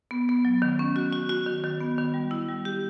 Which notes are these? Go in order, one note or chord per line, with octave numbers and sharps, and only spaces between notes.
B3
B3
F#3
D#3
C#4
F#4
F#4
F#4
D#3
D#3
B3
D#3
G3
E4
G3
G4